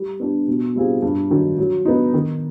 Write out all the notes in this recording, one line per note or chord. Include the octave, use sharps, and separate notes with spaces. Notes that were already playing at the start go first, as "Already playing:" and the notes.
Already playing: G3
B3 D4 G4
B2
G3 C4 F4 G#4
G2
D#3 F#3
F#3
B3 D#4
D#3